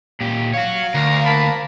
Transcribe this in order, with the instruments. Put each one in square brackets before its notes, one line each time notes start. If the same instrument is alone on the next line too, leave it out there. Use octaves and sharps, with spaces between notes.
[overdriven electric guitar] A#2 G4
[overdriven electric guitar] F#4 C#5 [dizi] F5
[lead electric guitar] D2 [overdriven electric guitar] A#4
[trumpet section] A#3 A5 B5